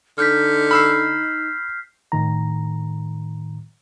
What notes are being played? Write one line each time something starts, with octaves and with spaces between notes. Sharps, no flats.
D3 D#4 F6 G6 B6
B5 E6 F6 C7
A2 D#3 A#5